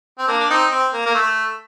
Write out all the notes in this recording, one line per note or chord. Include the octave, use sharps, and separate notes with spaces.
C4
A#3 D4
D4
C4 D#4
C4
A#3
A#3
A3